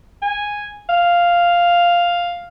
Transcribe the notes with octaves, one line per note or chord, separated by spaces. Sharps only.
G#5
F5